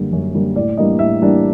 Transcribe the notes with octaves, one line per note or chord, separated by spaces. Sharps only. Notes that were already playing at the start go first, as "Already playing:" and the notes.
Already playing: F#2 D3 G3 A#3
F#2
D3 G3 A#3
A2 D5
E3 G3 A#3 D4 D#5
A2 E5
E3 G3 A#3 D4